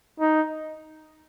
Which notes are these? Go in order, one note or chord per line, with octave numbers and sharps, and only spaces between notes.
D#4